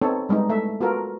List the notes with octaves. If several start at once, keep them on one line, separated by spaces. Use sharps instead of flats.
B3 C4 D#4 A4 C#5
G3 G#3 B3 D#4
A3 E5
B3 F4 F#4 A4 A#4